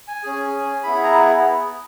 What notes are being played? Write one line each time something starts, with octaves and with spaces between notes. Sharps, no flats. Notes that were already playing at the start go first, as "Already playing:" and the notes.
G#5
C#4 G#4
B3 E4 G#4 B5
A#5